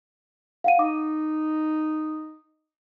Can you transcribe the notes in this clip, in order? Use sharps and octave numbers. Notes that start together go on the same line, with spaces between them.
F5 F#5 D#7
D#4 D6